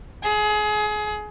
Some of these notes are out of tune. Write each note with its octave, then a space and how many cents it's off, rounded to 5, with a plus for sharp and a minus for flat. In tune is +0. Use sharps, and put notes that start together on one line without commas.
G#4 +25